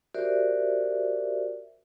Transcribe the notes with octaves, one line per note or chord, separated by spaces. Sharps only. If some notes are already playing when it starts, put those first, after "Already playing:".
F#4 G4 A#4 C5 D5 E5